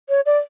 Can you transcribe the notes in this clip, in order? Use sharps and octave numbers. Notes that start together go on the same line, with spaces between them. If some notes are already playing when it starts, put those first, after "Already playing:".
C#5
D5